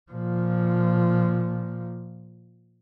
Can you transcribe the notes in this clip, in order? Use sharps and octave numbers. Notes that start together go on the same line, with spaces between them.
A#2 F3